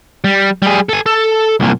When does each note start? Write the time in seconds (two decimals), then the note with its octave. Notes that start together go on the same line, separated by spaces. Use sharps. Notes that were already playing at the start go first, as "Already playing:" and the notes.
0.25 G3
0.62 G3 G#4
0.89 A4 G#5
1.06 A4
1.60 C2 A#2